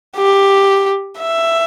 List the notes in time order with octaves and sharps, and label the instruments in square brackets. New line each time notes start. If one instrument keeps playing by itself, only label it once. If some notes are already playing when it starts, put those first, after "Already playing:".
[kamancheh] G4
E5